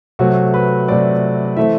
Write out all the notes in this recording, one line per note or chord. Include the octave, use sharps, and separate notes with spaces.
C3 F#3 A3 C4 F#4
B4
C3 F#3 A3 C4 D5
E3 A3 C4 E5